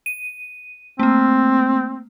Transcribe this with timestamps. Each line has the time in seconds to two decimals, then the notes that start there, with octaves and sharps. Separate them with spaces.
0.06 D#7
0.99 A3 A#3 C4